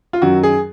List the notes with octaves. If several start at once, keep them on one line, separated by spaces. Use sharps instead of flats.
F4
F#2 D#3 F#3 F#4
G#4